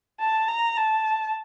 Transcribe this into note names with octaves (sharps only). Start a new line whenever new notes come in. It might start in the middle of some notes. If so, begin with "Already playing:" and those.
A5
A#5
A5